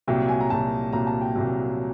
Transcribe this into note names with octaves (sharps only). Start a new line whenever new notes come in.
C2 A#2 F#3 G5
G#5
A#5
C2 A#2 F#3 A5
C2 A#2 F#3 A#5
A5
G5
C2 A#2 F#3